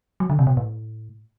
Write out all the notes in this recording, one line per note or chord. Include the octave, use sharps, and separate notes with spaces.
F#3
D3
C3
B2
A2